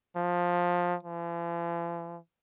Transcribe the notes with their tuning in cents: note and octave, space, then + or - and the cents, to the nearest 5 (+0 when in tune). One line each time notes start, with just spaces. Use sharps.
F3 +15
F3 -45